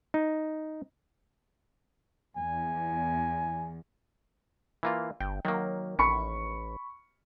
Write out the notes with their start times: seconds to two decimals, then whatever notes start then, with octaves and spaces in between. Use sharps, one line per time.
0.14 D#4
2.37 E2 G#5
4.83 E3 A#3 F4
5.20 G1 G5
5.45 D#3 F#3 A#3
5.99 A1 B5 C#6 C#7